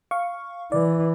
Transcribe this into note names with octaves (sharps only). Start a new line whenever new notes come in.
F5 C#6
E3 D5